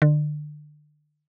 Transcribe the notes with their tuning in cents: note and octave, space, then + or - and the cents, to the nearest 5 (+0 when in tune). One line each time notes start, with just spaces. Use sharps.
D3 +30